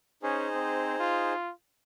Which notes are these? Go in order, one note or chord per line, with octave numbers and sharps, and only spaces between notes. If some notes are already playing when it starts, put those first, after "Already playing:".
C#4 D#4 G#4 C5
C4
F4